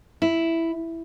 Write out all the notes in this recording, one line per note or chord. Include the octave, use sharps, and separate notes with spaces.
E4